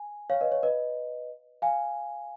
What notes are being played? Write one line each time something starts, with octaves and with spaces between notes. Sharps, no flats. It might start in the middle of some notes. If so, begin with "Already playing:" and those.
Already playing: G#5
C#5 F5
B4 D#5
C#5
B4 D#5
F5 G#5